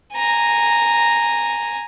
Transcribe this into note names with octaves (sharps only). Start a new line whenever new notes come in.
G#5 A#5